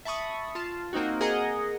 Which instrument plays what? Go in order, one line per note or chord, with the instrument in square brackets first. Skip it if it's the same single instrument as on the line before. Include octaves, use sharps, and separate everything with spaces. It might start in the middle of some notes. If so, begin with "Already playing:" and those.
[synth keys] E5 A5 B5 C#6 D#6
F4 A5
A#3 C4 D#4 F#4
G#4 A#4 D#5 F#5 A#5